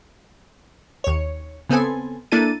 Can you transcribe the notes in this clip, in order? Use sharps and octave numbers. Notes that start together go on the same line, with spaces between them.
D#2 C#5
C#3 B3 C4 A4 G#5
A#3 D4 E4 A4 A6 D#7